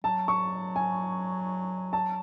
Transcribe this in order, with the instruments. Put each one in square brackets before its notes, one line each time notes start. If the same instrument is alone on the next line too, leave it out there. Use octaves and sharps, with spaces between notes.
[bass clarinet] F#3 [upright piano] A5
[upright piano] C#6
G#5
A5